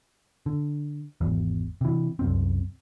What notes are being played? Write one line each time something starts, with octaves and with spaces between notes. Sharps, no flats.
D3
G#1 E2
C3 E3
C2 F#2 C4